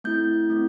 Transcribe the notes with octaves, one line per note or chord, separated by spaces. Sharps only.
A3 C4 E4 G6
A3 C4 E4